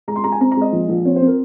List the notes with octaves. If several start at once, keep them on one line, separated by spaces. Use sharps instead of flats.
G#3 A#5
C6
G#3 A#5
G#5
C4 A#5
A#5
G#3
D#5
A#1
A#1
C4 C#5
C5
C4
A#4